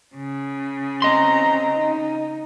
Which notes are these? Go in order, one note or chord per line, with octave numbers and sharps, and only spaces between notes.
C#3
C4 D#5 A#5 C6
D#4